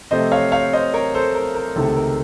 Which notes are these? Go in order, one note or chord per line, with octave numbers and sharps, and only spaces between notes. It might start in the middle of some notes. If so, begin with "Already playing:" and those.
C3 F3 A3 C5 D#5
C#5 F5
C#5 F5
C5 D#5
A#4 C#5
A4 C5
A#4
A#4
C#2 C3 D#3 A3 A4
A#4